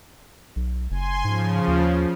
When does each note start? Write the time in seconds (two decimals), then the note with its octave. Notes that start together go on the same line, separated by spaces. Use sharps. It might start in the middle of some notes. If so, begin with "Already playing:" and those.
0.56 B1
0.91 F#1 G#5 C6
1.25 G#2 C#3 F3
1.68 D#2